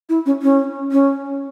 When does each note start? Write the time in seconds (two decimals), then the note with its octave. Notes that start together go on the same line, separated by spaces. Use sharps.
0.09 E4
0.26 C#4
0.42 C#4
0.92 C#4